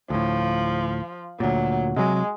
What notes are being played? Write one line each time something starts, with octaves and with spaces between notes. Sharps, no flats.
D2 A2 F3
D2 A#2 F#3
C3 F#3 G#3